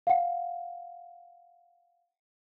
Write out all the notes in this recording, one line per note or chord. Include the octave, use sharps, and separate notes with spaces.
F5 F#5